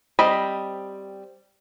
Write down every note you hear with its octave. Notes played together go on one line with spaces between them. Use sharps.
G3 C4 D#5 B5